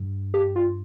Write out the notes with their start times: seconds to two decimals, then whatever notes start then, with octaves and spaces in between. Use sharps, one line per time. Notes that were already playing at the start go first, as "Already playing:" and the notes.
Already playing: G2
0.34 G4
0.56 F4